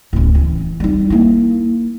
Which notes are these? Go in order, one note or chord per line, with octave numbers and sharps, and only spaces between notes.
D1 C#4
E3
G3 D#4
A#3 E4